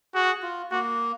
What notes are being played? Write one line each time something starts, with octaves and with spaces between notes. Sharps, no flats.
F#4 G#4
F4
A#3 F#4